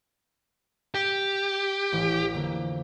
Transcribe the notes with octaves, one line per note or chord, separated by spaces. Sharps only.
G4
A1 E3 D7
F2 D3 A#3